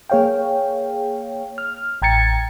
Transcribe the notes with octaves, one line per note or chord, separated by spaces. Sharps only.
A#3 G#4 C#5 F5 G5
F6
A1 G5 A#5 G#6 A6 C#7